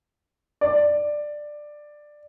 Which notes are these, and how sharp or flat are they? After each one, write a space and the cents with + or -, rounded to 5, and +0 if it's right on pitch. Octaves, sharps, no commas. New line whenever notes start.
D5 +10